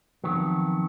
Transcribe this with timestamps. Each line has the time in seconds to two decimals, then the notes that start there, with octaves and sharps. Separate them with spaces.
0.24 F2 C3 D#3 F#3 B3